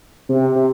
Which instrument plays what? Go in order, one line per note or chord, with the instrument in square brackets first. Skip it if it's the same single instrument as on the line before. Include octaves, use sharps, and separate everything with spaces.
[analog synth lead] C3
C3